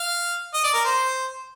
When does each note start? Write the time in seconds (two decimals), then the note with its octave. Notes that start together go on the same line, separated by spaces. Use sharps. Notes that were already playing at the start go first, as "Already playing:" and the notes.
Already playing: F5
0.54 D#5
0.64 D5
0.74 A#4
0.85 C5